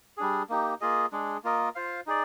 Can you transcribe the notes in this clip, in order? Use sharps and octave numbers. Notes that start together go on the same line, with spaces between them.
G3 D4 G#4
A#3 D#4 G4
A#3 F4 G#4 D#5
G#3 D4 G#4
A#3 F4 A#4 D#5
F4 C5 F5
D#4 G#4 D5